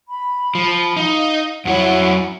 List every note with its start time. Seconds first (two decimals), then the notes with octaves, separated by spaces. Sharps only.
0.07 B5
0.55 F3
0.97 D#4 F5
1.65 F2 F#3 E4 C#5 E5 F#5